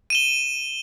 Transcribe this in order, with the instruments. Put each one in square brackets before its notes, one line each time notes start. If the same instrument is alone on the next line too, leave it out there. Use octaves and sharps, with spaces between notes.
[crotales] D#7 E7 G7